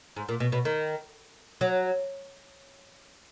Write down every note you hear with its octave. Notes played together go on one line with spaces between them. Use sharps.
G#2
A#2
B2
B2
D#3
F#3